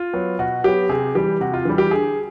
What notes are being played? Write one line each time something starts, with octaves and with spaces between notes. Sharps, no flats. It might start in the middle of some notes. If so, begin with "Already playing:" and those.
Already playing: F4
F#3 B3
B2 F#4
F#3 B3 G4
C3 G#4
E3 G3 G4
C3 F#4
F4
E3 G3
G4
D3 G#4